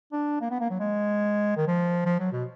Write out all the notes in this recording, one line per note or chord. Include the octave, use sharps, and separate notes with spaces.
D4
A#3
B3
A#3
F#3
G#3
D#3
F3
F3
F#3
B2